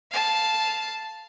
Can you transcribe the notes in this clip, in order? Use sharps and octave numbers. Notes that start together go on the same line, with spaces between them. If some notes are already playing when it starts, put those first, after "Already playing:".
F5 A5